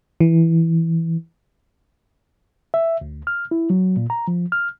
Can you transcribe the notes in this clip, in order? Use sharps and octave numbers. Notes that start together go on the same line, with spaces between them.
E3
E5
D2
F6
E4
F#3
A#2
A#5
F3
F6